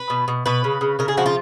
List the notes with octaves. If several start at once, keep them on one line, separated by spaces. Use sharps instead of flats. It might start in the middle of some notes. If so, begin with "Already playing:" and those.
Already playing: B4
B2
B2
B2 B4
C#3
C#3
C#3 A#4
G#4
F3 F#4
F4